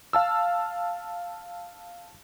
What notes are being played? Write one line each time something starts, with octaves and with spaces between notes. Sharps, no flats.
F5 A5 E6